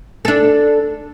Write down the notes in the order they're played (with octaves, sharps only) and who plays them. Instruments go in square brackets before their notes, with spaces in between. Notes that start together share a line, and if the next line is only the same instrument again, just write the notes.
[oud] D4 A4